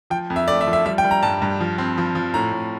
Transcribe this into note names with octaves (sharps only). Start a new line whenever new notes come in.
F3 G5
F2
E5
A3 D5
E5
F3
E5
G3 E5
G5
G3
A#5
G2 A5
G2
F3
C4
F3
F3
A2 A#5
A2